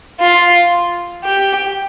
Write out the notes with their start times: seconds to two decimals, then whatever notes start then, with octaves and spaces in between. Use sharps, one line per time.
0.20 F4
1.24 G4